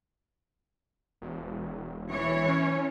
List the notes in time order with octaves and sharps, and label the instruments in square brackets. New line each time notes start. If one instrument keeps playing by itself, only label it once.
[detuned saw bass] E1
[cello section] E3 C#5
[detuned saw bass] C#4